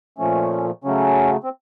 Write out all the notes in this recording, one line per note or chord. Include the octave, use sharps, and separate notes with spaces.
A#2 F3 A3 C#4
C#3 F#3 A3 C#4
C4